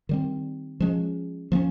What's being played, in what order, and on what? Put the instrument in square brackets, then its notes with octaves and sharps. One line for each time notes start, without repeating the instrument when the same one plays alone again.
[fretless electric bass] D#3 G3 C4
F3 G#3 C#4
F3 A#3 C#4